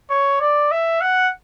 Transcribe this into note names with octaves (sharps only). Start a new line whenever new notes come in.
C#5
D5
E5
F#5